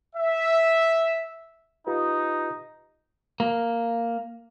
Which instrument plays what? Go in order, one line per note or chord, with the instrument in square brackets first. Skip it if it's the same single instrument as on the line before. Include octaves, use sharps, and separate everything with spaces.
[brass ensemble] E5
[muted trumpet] D#4 [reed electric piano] F4 G4 B4
[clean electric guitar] A#3